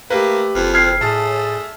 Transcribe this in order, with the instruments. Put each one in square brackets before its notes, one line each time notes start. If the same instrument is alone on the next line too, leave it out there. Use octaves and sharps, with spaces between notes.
[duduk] A3 [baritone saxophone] A#3 [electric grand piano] G4 B4
[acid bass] F#1 [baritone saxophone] F2
[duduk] C4 [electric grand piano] F6 G#6 C7
[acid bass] A2 [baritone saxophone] A3 [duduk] G#4 [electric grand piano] A5